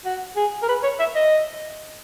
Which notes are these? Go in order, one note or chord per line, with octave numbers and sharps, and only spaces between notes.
F#4
G#4
A#4
B4
C#5
E5
D#5